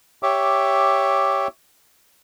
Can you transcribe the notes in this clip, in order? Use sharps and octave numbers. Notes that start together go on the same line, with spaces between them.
G4 C#5 E5 D6